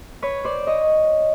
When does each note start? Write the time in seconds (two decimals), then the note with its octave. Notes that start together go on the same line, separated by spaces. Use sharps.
0.22 B4 C#5
0.44 C5 D5
0.67 C#5 D#5